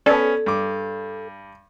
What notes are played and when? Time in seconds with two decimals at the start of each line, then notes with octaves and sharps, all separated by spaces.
0.06 B3 C#4 A4 D5
0.46 G2 D6